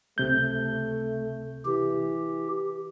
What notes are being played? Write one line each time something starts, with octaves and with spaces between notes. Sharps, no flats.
C#2 C3 A3 G6
E3 G4